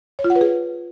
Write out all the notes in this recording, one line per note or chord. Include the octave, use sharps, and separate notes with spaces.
C#5
F4
F#5
B4
G#4